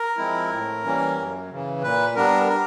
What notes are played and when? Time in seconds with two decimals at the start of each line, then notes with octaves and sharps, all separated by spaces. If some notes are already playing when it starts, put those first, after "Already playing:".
Already playing: A#4
0.17 F3 G#3 C4 E4
0.51 A2
0.84 E3 G3 A#3 C#4
1.17 F#2
1.50 C#3 E3
1.82 A#2 B4
2.16 G3 B3 D4 A#4
2.48 A#4